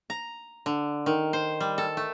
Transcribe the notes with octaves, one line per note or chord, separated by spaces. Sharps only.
A#5
D3
D#3
C5
G3
A4
A3